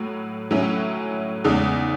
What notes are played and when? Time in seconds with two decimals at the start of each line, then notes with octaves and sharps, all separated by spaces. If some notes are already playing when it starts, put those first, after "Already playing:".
Already playing: A2 F#3
0.51 A2 F#3 C#4 E4
1.44 E2 C#3 G#3 D#4